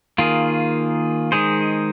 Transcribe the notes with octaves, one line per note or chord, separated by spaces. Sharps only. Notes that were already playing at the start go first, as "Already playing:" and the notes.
D#3 A#3 F4 G#4
D#3 G#3 D#4 G#4 C5